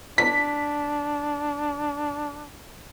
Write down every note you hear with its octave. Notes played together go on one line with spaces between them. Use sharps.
D4 B6